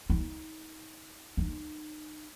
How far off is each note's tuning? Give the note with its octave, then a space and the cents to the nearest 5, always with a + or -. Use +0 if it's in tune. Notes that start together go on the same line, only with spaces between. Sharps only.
D#4 +30
D#4 -30